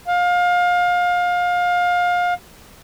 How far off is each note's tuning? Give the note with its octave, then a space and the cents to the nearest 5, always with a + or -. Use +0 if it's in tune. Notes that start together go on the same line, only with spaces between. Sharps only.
F5 +25